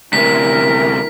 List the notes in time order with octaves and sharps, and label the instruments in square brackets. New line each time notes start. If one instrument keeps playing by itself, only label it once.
[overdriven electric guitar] D2 C3 [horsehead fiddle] E4 A#4 [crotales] B6